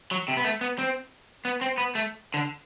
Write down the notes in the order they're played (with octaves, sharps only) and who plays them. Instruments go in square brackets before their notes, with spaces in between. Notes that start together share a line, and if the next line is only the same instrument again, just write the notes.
[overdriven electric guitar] F#3
C3
B3
A3
B3
C4
B3
C4
B3
A3
D3